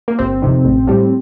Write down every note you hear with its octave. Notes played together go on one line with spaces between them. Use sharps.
A#3
G1 C4
F2 C3 D#3
A1
A2 G3